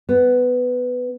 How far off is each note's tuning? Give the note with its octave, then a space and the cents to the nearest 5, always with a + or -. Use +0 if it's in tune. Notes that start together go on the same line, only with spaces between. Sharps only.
B3 +10